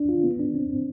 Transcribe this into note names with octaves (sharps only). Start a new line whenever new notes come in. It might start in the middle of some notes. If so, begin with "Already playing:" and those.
Already playing: D4
F4
B3
D4
C4
C4